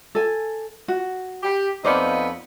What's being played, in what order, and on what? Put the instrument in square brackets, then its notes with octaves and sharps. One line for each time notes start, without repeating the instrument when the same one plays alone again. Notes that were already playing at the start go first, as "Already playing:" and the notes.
[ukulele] A4 G#5
F#4
[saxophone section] G4
[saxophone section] F2 B3 D#4 [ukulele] C5 D5 F5